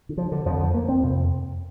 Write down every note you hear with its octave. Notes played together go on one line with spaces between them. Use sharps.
D3
F3
D3
F2 D3 F3
F3
A#3
C4
F2 C3